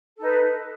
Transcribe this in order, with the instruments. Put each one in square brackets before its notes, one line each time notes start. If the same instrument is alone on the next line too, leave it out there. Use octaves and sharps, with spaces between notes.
[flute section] A4
D#4
B4